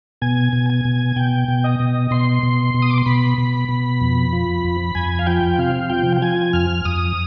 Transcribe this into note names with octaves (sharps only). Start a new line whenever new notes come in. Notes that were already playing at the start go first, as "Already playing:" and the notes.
B2 G#5
B2
G#5
B2
B2 G5
B2
D#5
B2
B2 C6
B2
B2
D#6
D6
C6
B2 B5
B2
B2
F2
F3
F2
F2 G#5
F5
F3 G5
C3 F5
F3 G5
G5
F3 G#5
F2 F6
F2 D#6